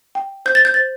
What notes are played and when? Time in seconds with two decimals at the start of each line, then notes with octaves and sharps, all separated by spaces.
0.15 G5
0.46 C5 G6
0.55 A6
0.65 G6
0.74 C5 A6